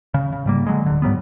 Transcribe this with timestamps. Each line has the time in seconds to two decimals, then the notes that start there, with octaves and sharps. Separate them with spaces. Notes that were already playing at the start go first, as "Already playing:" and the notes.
0.14 C#3
0.32 C#3
0.46 G#2 G3 A#3
0.66 D3 F#3 G#3
0.86 D1 D3
1.02 G#2 F#3 G3 B3